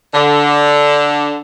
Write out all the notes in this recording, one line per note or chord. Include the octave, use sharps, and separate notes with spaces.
D3